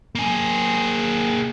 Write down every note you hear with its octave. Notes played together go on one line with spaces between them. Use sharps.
A#3 G#4